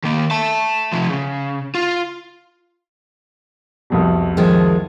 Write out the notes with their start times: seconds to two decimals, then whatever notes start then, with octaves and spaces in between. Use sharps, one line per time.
0.04 D#3 A#3
0.31 E5 A5
0.93 C3 F3
1.09 C#3
1.75 F4
3.90 C2 F2 B2
4.37 D#3 F3 G#3